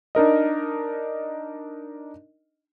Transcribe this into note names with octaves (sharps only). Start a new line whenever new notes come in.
D4 D#4 A#4 D#5